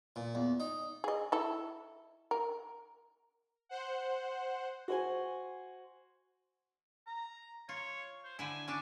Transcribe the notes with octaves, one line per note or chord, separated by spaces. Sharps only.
A#2
E2
D#4
G#4 D#5
E4 A4
A#4
C5 F#5
F#4 C5 G#5
A#5
F4 C#5
C5
D3 E4 G#5
C#4 D4 D6